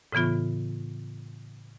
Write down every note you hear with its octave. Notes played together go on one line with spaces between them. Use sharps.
A2 C#3 E3 B3 F4